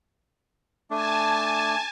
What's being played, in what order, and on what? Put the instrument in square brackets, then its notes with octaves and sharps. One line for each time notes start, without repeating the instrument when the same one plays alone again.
[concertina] A3 D4 [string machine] G#5 A5